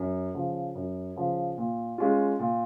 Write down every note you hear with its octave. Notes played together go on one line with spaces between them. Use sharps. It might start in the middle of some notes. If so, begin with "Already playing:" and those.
Already playing: F#2
C#3 F3
F#2
C#3 F3
A#2
G#3 C#4 F4
A#2